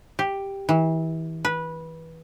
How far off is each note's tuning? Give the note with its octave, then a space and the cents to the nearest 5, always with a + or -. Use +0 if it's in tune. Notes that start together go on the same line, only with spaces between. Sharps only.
G4 +5
E3 -30
B4 -15